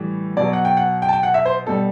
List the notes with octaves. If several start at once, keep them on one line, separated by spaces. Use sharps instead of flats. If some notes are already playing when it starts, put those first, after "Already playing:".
Already playing: A2 E3 G3
B2 F#3 D5
F#5
G5
F#5
G5
A5
G5
F#5
E5
C5
B2 G3 A4